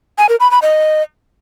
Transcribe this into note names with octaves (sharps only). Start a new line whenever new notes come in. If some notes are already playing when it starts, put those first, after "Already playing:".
G#5
A#4
B5
B5
D#5